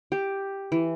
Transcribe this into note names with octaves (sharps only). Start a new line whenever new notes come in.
G4
E3